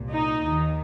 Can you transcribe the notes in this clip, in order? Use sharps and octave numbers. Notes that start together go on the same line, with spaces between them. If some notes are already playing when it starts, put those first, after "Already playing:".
Already playing: C2 A#2
D#4
D#2 D#3